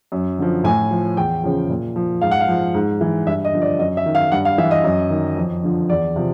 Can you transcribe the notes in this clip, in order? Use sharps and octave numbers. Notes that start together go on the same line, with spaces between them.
F#2
D3 F3
A2 G#5
F3
E2 G5
C#3 F3
A#2
F3
G#2 F5
F#5
F5
F3
G#2
E3
G2 E5
D#5
D3 F3
D5
F#2 D#5
E5
D#3
F5
G2 F#5
F5
E3 E5
D#5
F#2
D#3
F2
D3 F3
E2 D5
C3 F3